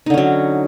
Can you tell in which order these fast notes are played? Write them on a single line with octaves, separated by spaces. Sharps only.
D#4 D3 C#4 F#3